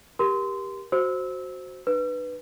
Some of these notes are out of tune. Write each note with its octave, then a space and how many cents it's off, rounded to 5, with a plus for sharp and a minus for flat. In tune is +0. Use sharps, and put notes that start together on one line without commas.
G4 +0 A#4 +20 C6 -20
F#4 +0 C5 +5 E6 -20
D4 +45 B4 +0